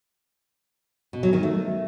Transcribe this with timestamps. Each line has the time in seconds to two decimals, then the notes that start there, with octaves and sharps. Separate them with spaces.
1.13 B2
1.23 F#3
1.33 D#3
1.43 A3